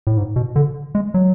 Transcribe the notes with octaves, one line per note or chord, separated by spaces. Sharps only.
A2
G#2
B2
D3
G#3
F#3